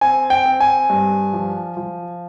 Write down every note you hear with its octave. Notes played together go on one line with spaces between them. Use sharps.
C4 G#5
G5
C4
G#5
G2
F3
F3